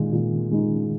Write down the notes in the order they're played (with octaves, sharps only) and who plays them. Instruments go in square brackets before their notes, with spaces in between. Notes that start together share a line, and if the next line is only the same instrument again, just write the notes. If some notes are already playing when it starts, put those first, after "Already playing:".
Already playing: [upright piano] A#2 G#3 D#4 [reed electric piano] D#3
[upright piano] A#2
G#3 D#4